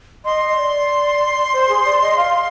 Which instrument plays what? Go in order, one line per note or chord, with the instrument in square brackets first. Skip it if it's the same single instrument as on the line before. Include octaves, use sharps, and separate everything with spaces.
[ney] D#5 [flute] C6
[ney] D#5
D5
C5
G#4
D5
D#5
F5